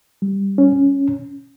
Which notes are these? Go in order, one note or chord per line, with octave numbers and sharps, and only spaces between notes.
G3
C#4